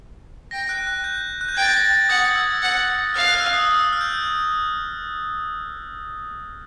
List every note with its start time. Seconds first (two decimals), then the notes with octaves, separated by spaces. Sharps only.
0.51 G5 A#6
0.69 F#6
0.87 F#6
1.04 G6
1.41 F#6
1.49 G6
1.55 G5 G#6
1.62 A6
1.69 A#6
1.83 A6
1.95 A6
2.09 F#5 D#6
2.25 D#6
2.36 E6
2.62 F#5
3.14 F5 F6
3.27 F#6
3.35 F6
3.40 E6
3.53 D#6
3.67 D#6
3.79 E6
3.93 F6
4.01 G6